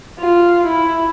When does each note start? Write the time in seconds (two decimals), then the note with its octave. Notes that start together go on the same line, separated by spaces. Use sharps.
0.19 F4
0.66 E4